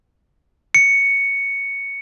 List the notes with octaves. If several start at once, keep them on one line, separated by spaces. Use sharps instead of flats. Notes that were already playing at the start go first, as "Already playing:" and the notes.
C#7